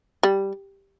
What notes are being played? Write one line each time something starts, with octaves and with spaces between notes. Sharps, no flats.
G3